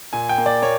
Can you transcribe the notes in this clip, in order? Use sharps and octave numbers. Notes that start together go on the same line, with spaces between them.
A#2 G#5
G5
A#3
D5
A#3 C#5